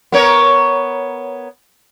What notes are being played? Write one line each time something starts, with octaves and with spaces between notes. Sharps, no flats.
B3 A#4 C#5